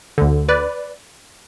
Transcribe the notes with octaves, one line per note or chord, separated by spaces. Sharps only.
D2 D3
B4 D5